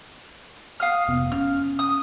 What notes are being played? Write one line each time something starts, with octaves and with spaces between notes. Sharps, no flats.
F5 D#6 F6
F1 C3 B3
C#4 F6
D#6